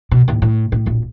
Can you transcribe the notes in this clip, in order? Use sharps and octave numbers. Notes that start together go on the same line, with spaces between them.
B2
D#2 A2
A2
A2
D1 A#1